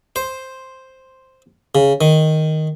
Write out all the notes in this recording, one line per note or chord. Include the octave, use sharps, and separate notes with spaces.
C5
C#3
D#3